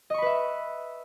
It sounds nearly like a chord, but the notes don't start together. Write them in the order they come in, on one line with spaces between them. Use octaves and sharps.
D#5 C#6 B5 B4 E5